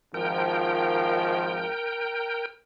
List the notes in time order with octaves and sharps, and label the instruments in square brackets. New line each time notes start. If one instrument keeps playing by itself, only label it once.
[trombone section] G#1 D#3 F3 [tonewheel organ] A#4 G5